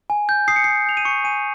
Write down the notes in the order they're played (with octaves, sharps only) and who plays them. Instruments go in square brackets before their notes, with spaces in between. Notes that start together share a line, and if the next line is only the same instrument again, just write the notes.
[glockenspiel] G#5
G6
D#6 C7
C#7
G#5 C7
G6 F7
D#7
C#6 C#7
G#5 D#7